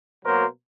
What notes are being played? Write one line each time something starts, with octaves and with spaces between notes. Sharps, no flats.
B2 F#3 A#3 A#4 C5